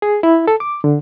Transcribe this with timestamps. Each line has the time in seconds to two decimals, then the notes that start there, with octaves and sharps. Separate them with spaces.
0.02 G#4
0.23 E4
0.48 A4
0.60 D6
0.84 D3